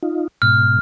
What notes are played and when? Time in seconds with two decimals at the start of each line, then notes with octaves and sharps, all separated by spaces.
0.03 D#4 F4
0.42 G#2 B2 F6